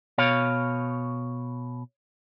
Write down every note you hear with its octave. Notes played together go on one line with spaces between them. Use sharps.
B2 C#5 F5